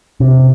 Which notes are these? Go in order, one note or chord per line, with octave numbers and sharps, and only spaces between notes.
C3